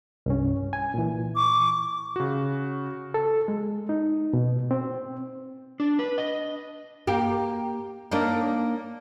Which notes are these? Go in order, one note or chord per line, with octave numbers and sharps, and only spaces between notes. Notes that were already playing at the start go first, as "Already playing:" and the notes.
C2 G2 C#4
G#5
A#2 E3
C#6 D6
C#3 F#4
A4
G#3
D#4
B2
C4
D4
B4
D#5
A#3 G4
A#3 D4 D#4